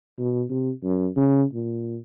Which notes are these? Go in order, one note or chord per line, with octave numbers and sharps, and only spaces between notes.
B2
C3
F#2
C#3
A#2